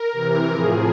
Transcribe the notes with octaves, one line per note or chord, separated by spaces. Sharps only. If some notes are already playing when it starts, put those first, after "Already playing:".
Already playing: A#4
C3 E3
A2 F3 G#4